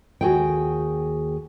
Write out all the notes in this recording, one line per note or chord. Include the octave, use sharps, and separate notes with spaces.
D#2 F#4 G#4 G5